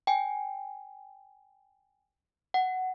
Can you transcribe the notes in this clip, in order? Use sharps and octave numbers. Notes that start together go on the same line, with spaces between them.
G5 G#5
F#5